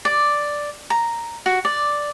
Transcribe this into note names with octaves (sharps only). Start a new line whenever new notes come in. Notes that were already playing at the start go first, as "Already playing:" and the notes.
D5
A#5
F#4
D5